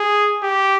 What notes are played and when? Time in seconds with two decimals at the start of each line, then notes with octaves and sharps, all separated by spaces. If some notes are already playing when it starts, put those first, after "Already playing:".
Already playing: G#4
0.43 G4